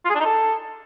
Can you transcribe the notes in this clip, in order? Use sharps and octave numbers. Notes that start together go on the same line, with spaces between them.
F4
G#4
D4
D#4
A4